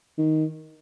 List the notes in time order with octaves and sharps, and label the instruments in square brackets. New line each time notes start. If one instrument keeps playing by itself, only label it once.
[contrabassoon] D#3